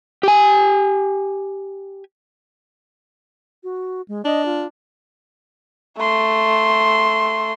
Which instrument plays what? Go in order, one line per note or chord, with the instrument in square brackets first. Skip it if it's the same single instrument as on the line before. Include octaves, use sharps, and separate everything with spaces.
[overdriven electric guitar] G4 G#5
[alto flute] F#4
G#3
[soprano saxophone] D4 [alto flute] D#5
[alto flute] F4
[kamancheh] A3 C6